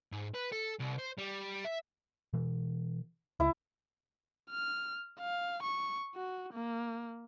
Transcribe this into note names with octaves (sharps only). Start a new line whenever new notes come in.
G#2
B4
A4
C2
C5
G3
E5
B2 E3
C#2 E4 E5
F6
F5
C#6
F#4
A#3